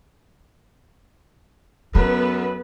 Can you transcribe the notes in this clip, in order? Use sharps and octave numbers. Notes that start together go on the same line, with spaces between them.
F#2 B3 C#4 A4 B4